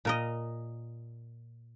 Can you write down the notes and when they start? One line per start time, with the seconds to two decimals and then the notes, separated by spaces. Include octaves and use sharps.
0.05 A#2 A#4 D#5